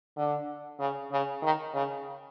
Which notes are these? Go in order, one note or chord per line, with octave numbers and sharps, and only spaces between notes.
D3
C#3
C#3
D#3
C#3